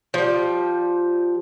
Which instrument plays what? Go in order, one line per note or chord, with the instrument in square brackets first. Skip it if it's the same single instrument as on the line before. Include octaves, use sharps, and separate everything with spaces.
[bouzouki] F3 G3